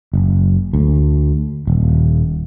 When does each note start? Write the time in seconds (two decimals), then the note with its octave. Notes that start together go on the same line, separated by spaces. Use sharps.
0.14 F#1
0.73 D2
1.67 D#1